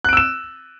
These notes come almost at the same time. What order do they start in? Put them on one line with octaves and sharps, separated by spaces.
F#6 D7 E6 E7